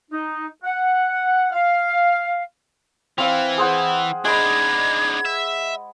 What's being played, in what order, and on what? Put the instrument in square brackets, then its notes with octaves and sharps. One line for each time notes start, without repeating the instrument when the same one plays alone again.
[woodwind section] D#4
F#5
F5
[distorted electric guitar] E3 [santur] C4 F5
[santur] G#4 C5 F#5
[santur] G#3 B5 [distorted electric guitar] D4 D#4 [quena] G#6
[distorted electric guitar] E5